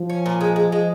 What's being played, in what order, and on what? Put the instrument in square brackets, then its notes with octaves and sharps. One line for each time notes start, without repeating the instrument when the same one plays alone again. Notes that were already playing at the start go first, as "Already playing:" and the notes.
Already playing: [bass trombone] F3
[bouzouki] C#4
A#2
G#3
G#3
G#3